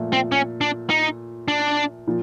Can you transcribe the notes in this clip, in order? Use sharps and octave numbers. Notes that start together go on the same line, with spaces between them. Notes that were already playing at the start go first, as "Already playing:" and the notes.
Already playing: A#2 F3 A3
C4
C#4
D4
D#4
D4
A#2 F3